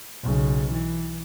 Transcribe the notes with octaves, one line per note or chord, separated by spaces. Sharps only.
B1 C#3
E3